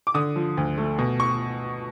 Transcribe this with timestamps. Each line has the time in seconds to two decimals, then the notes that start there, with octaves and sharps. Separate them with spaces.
0.07 D6
0.14 D3 D#6
0.36 F3
0.57 D2
0.78 A3
0.99 B2
1.20 C#6